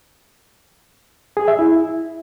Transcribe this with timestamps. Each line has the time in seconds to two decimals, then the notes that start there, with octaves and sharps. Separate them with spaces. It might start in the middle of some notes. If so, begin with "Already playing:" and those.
1.37 G#4
1.48 E5
1.59 E4